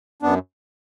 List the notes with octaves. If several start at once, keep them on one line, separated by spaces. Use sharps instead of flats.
F#2 B3 D4